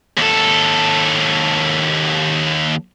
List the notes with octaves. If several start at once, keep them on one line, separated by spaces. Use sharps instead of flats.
D#2 A4